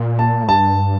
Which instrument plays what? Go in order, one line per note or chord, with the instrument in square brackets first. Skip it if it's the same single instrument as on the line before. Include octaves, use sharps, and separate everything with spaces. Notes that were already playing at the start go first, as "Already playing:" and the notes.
Already playing: [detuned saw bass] A#2
[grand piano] A5
[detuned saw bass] A2
[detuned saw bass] G2 [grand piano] A5